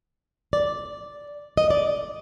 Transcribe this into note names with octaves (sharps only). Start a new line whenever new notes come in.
D5
D#5
D5